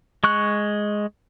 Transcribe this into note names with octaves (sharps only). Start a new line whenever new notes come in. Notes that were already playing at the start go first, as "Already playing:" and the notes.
G#3 C#6 F#6